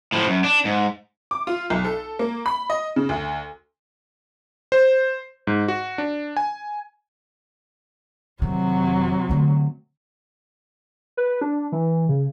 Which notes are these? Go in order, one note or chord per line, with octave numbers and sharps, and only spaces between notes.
A2 F3
F#2
D4
G#2
D6
F4
B1
A4
A#3
B5
D#5
C#3
D2
C5
G#2
F#4
D4
G#5
F1 C3 D#3 F#3
D3 A3
B4
D4
E3
C#3